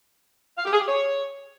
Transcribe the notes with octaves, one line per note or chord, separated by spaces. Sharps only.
F5
G4
G#4
G4
C#5